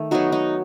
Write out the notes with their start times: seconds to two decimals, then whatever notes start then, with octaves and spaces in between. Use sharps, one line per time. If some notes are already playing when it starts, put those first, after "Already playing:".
Already playing: D#3 A3
0.11 F#3 B3 D#4 F#4
0.32 D#4